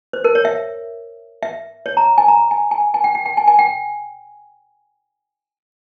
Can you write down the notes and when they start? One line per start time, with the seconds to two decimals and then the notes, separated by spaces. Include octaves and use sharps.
0.13 C5
0.24 A#4
0.35 C#5
0.45 E5
1.43 E5
1.86 C#5
1.97 A#5
2.18 G#5
2.28 A#5
2.51 G#5
2.71 G#5
2.94 G#5
3.04 G5
3.15 G5
3.26 G5
3.37 G#5
3.48 G#5
3.59 G5